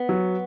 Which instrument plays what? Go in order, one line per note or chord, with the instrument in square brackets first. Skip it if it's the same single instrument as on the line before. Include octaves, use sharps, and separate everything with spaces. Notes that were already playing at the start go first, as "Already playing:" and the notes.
Already playing: [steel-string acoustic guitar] B3
[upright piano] F#3